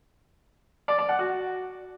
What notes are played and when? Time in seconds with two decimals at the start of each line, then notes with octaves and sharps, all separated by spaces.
0.88 D5
0.98 D5
1.09 F#5
1.19 F#4